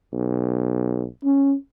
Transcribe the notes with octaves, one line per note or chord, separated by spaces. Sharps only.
B1
C#4